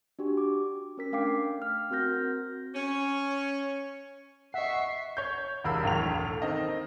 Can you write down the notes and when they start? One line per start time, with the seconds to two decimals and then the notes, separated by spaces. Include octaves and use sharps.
0.19 D4 F#4 G4
0.37 D6
0.98 C#4 A#4 B6
1.12 A3 D4 F5 G5 D6 C7
1.62 F6
1.91 C4 F#4 A#4 F6 G6 A#6
2.75 C#4 C#5
4.54 D#5 E5 F#5 C#6 C7
5.17 C#5 G6
5.64 E1 C2 A#4 F5 B5 E6
5.83 E1 B1 A2 F7
6.19 A4
6.42 D#3 C4 D#5